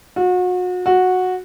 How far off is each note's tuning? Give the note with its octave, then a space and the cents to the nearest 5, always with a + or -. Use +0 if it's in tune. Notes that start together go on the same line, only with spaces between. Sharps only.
F#4 -35
F#4 -10